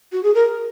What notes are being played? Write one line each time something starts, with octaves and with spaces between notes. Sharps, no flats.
F#4
G#4
A#4